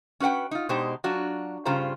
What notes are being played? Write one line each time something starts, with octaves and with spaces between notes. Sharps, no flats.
C#4 F#4 B4 F#5 G5
D#4 F4
B2 G#3 D4 D#4 G4 C5
F#3 D4 F4 F#4
G2 C#3 F4 G4 C5 A#5